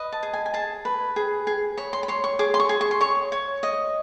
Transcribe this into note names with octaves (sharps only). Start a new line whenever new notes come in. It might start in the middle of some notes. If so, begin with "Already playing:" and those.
Already playing: B4 D#5
A5
G#4
G#5
G#5
G#4 A5
B4
G#4
G#4
C#5 B5
C6
B5
C#5 C6
C#6
G#4 D6
C6
C#6
G#4
C#6
C6
C#5 C#6
C#5
D#5